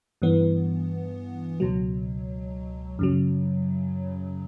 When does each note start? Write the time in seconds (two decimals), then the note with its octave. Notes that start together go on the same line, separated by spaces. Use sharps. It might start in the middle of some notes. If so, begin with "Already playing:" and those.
0.22 G2 E3 B3
1.60 C#2 B2 F#3
2.99 F#2 C#3 F#3